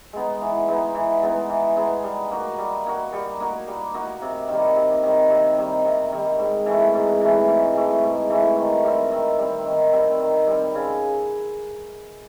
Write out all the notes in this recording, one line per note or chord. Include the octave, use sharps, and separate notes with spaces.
G#3 B3 D#4
E3
G#3 B3 D#4
E3
G#3 B3 D#4
E3
G#3 B3 D#4
G3
A#3 D#4 F#4
G3
A#3 D#4 F#4
G3
A#3 D#4 F#4
G3
A#3 D#4 F#4
C3
D#3 G3
C3
D#3 G3
C3
D#3 G3
C3
D#3 G3
G#2
E3 A3
G#2
E3 A3
G#2
E3 A3
G#2
E3 A3
D#3
G3 C4
D#3
G3 C4
D#3
G3 C4
D#3
G3 C4
C#3